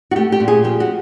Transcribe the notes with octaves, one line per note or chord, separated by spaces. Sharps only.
F#4
A3 G4
G4
A#2
G#4
F3 G4
F#4